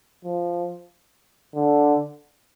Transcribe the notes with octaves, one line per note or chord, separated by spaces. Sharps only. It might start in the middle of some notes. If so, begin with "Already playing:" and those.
F3
D3